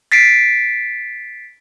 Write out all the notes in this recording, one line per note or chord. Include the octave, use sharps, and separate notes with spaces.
A6 B6 C7 D7